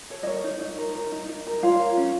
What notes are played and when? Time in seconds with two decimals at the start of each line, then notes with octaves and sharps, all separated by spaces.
0.10 A4 C#5
0.23 D#5
0.27 A#4 C#5
0.44 D#4
0.61 D#4
0.78 A#4
0.95 A#4
1.12 D#4
1.29 D#4
1.47 A#4
1.63 F4 C#5 F5
1.80 A#4
1.97 C#4